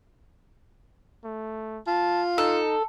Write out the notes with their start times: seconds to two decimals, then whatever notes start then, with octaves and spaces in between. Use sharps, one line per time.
1.24 A3
1.87 F4 A5
2.38 D#4 A4